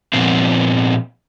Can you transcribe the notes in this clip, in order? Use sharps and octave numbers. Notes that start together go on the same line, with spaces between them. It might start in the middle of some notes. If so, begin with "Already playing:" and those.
A#2 F3 B3 C4